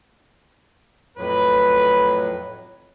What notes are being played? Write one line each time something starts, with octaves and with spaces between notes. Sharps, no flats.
F2 A2 F#3 B4